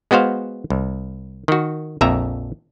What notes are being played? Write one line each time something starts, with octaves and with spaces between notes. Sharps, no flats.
G#3 B3 F#4 C5 F5
C2
D#3 F#4
A#1 F2 E5 A#5